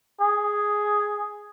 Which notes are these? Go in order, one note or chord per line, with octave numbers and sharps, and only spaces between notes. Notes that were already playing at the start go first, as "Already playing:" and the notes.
G#4